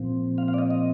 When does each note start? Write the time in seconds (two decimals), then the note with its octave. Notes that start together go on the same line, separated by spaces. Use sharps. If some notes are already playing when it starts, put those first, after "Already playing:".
Already playing: A#2 F3 C4
0.38 F5
0.48 F5
0.54 D5
0.58 D#5
0.71 D#5